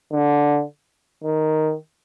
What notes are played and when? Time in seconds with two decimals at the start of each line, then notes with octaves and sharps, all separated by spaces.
0.12 D3
1.24 D#3